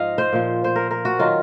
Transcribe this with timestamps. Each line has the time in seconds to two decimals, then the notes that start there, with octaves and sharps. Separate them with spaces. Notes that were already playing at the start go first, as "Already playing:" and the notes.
Already playing: G#2 F3 D#5 F5
0.18 C5
0.33 A#2 F3
0.64 C5
0.76 A#4
0.91 A#4
1.05 F#4
1.19 D#3 F#3 F4